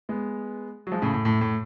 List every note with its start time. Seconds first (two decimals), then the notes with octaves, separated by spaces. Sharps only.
0.09 G#3 B3
0.87 F#3
0.92 F3 G#3
1.02 A2 C#3
1.13 A2
1.25 A2
1.41 A2